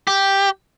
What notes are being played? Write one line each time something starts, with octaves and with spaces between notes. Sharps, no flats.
G4